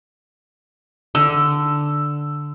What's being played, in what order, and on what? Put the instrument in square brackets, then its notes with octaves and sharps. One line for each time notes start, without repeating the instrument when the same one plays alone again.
[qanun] D3 [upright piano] E6